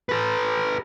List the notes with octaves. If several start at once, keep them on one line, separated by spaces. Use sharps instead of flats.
A4 B4